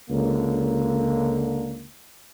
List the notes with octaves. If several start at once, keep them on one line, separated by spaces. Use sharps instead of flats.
C#2 D3 A#3